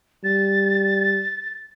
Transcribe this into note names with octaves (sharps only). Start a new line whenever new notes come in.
G3 A6